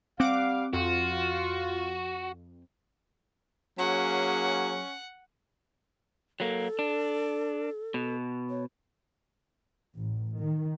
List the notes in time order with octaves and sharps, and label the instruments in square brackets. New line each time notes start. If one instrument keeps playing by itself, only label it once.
[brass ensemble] G3 F5 [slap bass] C4 [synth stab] F#5 D6
[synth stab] F2 [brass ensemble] F4 [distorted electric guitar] F#4
[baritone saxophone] F#3 [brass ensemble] A#3 G#4 [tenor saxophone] C#4 [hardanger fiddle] F#5
[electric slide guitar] F#3 A#3 [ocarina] A4
[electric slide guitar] D4
B2
[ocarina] C#5
[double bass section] A1
D#3